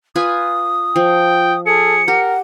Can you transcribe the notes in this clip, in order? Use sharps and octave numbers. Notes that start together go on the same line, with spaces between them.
F4 B4 G#5 D#6
F3 G5
G#4 A4 C#7
G4 A#4 F#5